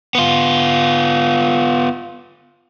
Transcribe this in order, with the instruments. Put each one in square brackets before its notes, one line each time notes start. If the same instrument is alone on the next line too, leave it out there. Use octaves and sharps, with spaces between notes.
[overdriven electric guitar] B3 F4